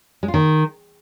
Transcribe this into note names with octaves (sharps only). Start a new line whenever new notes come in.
G#3
F4
D#3